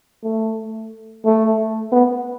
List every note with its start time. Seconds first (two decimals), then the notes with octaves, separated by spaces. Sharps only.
0.23 A3
1.25 A3
1.92 B3